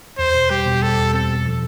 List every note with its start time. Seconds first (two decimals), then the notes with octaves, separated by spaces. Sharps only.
0.18 E2 C5
0.35 B2
0.50 G3 G4
0.66 B2
0.82 G3 A4
0.98 E2
1.14 C4 A4
1.29 B2
1.46 F3